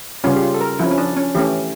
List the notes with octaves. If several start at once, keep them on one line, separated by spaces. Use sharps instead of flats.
C#3 G3 C#4 F4
G4
F4
A4
A#4
F3 C#4 E4
C#4
D4
C#4
E3 A3 C#4 G4